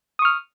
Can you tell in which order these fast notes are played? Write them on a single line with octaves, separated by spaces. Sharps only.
D#6 C#6 F6